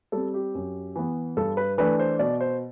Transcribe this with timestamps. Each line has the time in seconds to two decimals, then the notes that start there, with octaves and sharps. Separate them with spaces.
0.12 G3 C4 A4
0.34 G4
0.54 F#2
0.96 E3 B3
1.37 G2 A4
1.57 B4
1.78 E3 A3 D4 B4
1.99 C5
2.19 B2 D5
2.41 C5